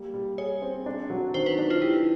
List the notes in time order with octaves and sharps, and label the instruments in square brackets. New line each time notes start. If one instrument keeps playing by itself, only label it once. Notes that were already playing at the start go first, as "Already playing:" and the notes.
Already playing: [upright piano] G3 A#3
G3
[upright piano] G#4 [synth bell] C#5
[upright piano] C4
D4
F#3
[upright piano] D#3 [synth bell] C5
[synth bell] B4
[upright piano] D4
[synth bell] F4
[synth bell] E4 [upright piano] G4